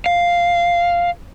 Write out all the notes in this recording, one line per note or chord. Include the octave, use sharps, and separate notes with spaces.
F5